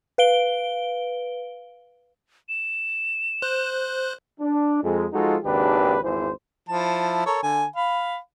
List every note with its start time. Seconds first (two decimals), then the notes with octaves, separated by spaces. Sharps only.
0.18 B4 F5 D7 G7
2.49 E7
3.42 C5 F#6
4.40 D4
4.83 F2 G#3
5.13 F3 G#3 D#4 F4 F#4 A4
5.44 G#1 D#2 C#3 D4 G4 B4
6.03 G#1 E2 E3 C5
6.69 F3 E4 A5
7.26 A4 A#4 C#5
7.43 D3 G#5
7.76 F5 B5